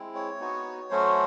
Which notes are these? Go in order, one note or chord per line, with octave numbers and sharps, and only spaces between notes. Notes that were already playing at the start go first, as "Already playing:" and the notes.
Already playing: G#3 C4 E4
C#5
B3 D#4 F#4
F#3 A3 C#4 F#4 C5